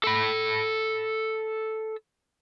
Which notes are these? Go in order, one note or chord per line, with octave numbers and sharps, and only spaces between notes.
A4 B5